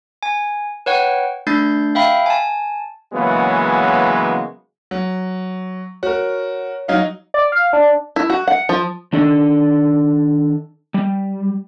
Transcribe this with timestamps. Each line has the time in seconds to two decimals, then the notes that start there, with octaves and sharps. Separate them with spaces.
0.23 G#5
0.86 B4 C#5 F#5 G5
1.47 A3 D4 G6 A6 C7
1.95 E5 F5 G5 B5
2.26 G#5 A5
3.13 C#3 E3 F#3 G#3 A#3 B3
4.91 F#3
6.03 F#4 A#4 C#5
6.88 F#3 D#4 F5
7.34 D5
7.52 F5
7.73 D4
8.16 E4
8.30 F#4
8.48 F#5
8.69 F3
9.13 D#3 D4 A4 D5
10.94 G3